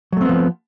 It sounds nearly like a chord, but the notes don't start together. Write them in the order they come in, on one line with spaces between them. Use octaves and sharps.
F#3 A3 C4 B3 F3